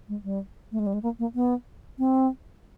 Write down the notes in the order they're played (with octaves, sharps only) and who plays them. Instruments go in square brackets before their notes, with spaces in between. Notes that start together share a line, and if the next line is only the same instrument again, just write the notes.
[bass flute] G#3
G3
A3
G#3
G3
G#3
A#3
A#3
B3
C4